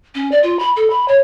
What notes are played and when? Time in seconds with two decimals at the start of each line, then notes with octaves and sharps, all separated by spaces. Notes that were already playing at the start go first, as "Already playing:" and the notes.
0.15 C#4
0.32 D5
0.43 F4
0.59 B5
0.76 A4
0.90 B5
1.08 C#5